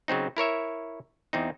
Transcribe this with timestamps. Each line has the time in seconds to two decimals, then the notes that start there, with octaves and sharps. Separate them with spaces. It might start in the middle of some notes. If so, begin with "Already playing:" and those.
0.08 C#3 F#3 C4 D#4
0.37 E4 A#4 C#5 E5
1.33 E2 C4 D#4